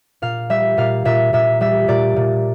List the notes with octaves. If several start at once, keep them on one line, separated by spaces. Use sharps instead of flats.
A#2 F5
G3 E5
A#2 F5
A#2 E5
A#2 E5
G3 E5
A#2 D5
A#2